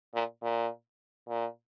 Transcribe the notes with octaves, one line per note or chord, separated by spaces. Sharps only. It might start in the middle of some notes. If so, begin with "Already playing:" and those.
A#2
A#2
A#2